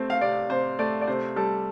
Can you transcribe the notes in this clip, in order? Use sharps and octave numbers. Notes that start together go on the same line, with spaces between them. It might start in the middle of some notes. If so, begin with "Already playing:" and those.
Already playing: C3 A3 C4 C5
F5
C3 D5
C3 C5
A3 D5
D5
C3 C5
G3 A4